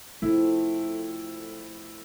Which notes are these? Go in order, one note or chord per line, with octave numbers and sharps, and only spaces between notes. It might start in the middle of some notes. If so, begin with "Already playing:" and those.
F3 A3 C4 E4